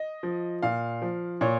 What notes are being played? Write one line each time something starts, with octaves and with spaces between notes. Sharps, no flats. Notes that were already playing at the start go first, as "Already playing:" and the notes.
Already playing: D#5
F3
A#2 F5
F3
A#2 C#5